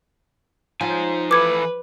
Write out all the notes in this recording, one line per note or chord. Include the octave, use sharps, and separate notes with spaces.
F3 D#4 G#5
E3 E4 A4 B4 D6 G#6